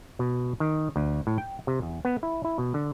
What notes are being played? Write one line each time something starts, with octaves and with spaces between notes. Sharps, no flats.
B2
D#3
D2
A2
G5
C3
E2
B3
E4
E4
B2
D3